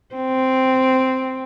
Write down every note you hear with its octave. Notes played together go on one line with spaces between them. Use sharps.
C4